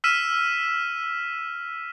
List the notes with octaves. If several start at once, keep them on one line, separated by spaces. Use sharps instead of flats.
E6 F6 B6 D#7 E7